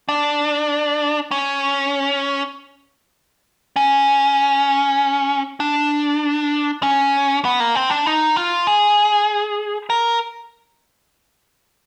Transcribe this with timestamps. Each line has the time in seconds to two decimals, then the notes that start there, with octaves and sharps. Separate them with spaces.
0.09 D4
1.31 C#4
3.76 C#4
5.60 D4
6.83 C#4
7.45 B3
7.60 A#3
7.75 C4
7.90 D4
8.06 D#4
8.36 F4
8.67 G#4
9.90 A#4